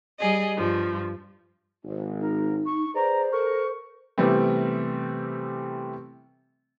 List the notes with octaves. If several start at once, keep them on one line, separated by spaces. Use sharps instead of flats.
G3 G#4 D#5
G2 F3
G#1
D#4 A#4
C#6
G#4 B4 C5 D5 A#5
A4 A#4 C#6
C3 E3 G3 A3 B3 C4